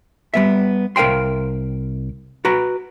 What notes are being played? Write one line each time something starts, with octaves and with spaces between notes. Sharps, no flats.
G3 B3 E5
C2 A#4 F5 G5 C6
F#4 B4 A#5 B5